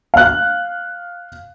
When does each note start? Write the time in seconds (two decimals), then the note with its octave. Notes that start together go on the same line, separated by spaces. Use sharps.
0.14 F5 F#6